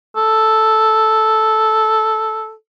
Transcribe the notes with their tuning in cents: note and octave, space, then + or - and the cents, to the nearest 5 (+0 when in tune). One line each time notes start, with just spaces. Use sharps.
A4 -5